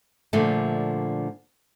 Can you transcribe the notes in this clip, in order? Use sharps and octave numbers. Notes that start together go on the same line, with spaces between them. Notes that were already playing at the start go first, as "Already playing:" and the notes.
A#2 D3 F3 A3